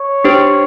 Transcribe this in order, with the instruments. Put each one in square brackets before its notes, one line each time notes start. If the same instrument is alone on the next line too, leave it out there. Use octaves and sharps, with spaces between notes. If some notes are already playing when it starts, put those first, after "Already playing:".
Already playing: [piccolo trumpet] C#5
[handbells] D4 G4 C5